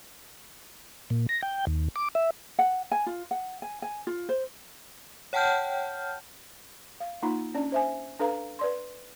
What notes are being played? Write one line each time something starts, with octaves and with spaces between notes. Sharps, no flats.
A#2
A#6
G5
D#2
D6
E5
F#5
G#5
F4
F#5
G#5
G#5
F4
C5
C#5 F#5 G5 A5 F6 G6
F5
A#3 D#4 F4 A#5 B5
C#4 D4 D5
C5 E5 G#5
D4 A4 B4 F5 A#5
B4 D5 C6